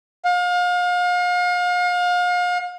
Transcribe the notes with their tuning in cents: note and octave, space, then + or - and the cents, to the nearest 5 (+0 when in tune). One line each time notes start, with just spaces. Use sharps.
F5 +35